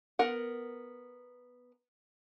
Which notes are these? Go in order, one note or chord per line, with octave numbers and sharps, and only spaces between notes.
B3 A#4 F#5